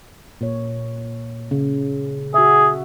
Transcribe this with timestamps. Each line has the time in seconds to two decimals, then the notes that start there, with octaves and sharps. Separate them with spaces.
0.41 A#2 C#5
1.51 C#3
2.34 F#4 G#4 E5